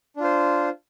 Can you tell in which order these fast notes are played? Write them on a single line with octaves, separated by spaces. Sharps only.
D4 F4 C5